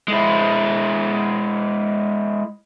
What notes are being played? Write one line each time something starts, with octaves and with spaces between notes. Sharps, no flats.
G#3 E4